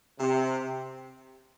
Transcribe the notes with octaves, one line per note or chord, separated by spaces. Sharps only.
C3